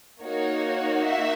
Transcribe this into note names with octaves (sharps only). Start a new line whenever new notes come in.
A#3 D#4 F#4 C#5
E5